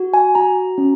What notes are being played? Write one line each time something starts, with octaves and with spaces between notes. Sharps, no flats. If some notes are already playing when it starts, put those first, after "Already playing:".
Already playing: F#4
G#5
F#4 A#5
C#4